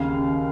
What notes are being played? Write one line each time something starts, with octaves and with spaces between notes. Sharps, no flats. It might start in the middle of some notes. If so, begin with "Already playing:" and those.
Already playing: D#2 C#3 F5